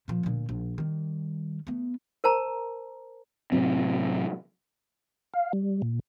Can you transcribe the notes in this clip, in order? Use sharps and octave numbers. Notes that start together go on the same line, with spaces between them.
A#2 F3
D2 A#2
A#1
D#3 G3
A3 B3
A#4 C5 A5 A#5
A2 C3 F#3 C4
F5
G3
A#2